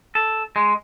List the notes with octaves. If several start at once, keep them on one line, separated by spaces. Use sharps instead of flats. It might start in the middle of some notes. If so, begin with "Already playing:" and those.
A4
G#3